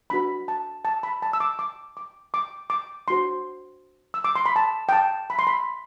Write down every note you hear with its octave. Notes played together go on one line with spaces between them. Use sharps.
D4 F#4 B4 B5
A5
A5
B5
A5
E6
D6
D6
D6
D6
D6
D4 F#4 C5 C6
E6
D6
C6
B5
A5
G5
A5
B5
C6
B5